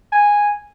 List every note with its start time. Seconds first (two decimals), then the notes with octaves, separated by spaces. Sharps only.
0.12 G#5